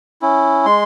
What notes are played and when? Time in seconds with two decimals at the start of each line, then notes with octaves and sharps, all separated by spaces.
0.22 C#4 E4
0.65 G#3 C6